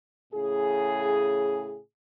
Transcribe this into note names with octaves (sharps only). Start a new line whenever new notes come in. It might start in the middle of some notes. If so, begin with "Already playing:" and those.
A2 C#3 G#4